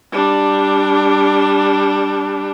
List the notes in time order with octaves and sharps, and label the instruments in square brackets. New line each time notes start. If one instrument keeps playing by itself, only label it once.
[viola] G3 D4